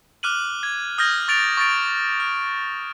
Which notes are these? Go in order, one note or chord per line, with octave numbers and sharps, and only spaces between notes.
D6 F6 F#6 D#7 F#7
G#6
D#6 F6 G6 G#6 A#6 G7
C#6 A6 D7 F7
C#6 A6 D7
F6